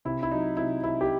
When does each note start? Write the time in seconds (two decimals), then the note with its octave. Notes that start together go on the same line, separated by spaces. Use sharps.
0.05 C3 E4
0.23 E4
0.32 F#3 D#4
0.57 C3 E4
0.83 C3 E4
1.01 G4